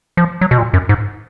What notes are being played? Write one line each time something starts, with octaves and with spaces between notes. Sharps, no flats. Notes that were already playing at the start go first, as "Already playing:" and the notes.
F3
F#3
B2
A#2
F#2
G#2